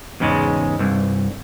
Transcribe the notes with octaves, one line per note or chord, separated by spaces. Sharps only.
E2 G#2 C#3 G#3
C2 G2